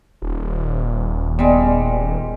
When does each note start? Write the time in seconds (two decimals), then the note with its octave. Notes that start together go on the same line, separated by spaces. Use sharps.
0.22 D#1
1.39 G3 G#3 B3